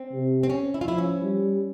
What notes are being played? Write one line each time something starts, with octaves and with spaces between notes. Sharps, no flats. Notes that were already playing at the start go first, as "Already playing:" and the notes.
Already playing: C4
C3
C4
C#4
E4
F4
F3 E4
C#4
G3